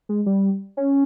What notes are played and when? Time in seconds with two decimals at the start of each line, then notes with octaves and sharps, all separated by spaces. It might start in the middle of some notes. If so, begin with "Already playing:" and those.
0.09 G#3
0.26 G3
0.77 C#4